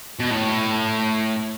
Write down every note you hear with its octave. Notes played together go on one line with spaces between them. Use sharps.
B2
A2